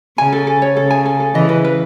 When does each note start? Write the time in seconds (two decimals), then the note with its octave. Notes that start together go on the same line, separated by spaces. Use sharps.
0.18 C#3 G#5
0.33 A4
0.47 A4
0.62 C#5
0.77 C#3 A4
0.91 G#5
1.06 A4
1.20 A4
1.34 C#3 E3 D#5
1.49 B4
1.65 B4